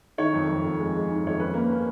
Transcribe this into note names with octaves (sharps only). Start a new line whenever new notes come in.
D#3 C#5
F2
F2
F2
G#3
G#3
D#3
F2 C#5
C#4 B4
A#3
C#4